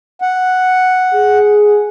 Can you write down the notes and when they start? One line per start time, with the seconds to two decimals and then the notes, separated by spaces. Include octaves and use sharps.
0.22 F#5
1.14 G#4